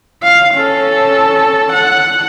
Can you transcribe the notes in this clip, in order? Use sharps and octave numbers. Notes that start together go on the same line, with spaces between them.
F5
C#4 A4
F#5